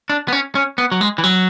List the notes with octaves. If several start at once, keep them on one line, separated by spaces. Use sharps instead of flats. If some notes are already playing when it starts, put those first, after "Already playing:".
D4
B3
C#4
C#4
B3
F#3
G#3
E3
F#3